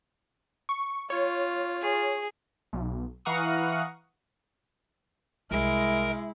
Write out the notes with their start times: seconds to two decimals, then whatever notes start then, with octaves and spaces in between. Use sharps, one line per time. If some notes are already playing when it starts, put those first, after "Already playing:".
0.69 C#6
1.10 F4 C#5
1.81 G#4
2.73 B1
3.25 E3 F5 F#5 A#5 C#6 D#6
5.51 C2 G#3 E4 A#4